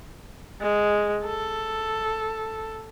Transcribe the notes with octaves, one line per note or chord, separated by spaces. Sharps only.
G#3
A4